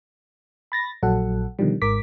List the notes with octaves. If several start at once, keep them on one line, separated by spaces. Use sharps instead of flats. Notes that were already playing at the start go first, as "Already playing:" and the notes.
B5 A6 A#6
A#1 F#3 A4 F#5
B2 D3 D#3 F3 G3
G#1 G#2 A#4 D6 B6